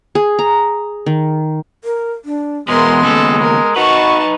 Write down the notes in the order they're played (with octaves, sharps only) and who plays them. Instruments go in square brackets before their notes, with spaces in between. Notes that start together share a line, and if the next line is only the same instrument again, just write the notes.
[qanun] G#4
A#5
D#3
[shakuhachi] A#4
D4
[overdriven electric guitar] E2 B2 [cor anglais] G#3 [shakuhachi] B3 [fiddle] A#4 C6
[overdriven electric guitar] D#2 C#3 [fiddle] A4
[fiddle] A#4
[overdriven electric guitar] D#4 B4 [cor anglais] F#4 [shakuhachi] D#5 [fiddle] A5 C#6